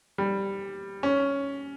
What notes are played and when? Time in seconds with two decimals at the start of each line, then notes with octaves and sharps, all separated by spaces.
0.18 G3
1.03 C#4